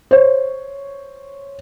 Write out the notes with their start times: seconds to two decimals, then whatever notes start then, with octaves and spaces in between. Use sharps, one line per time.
0.11 C5 C#5